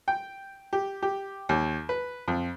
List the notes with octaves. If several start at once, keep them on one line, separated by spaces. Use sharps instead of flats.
G5
G4
G4
D#2
B4
F2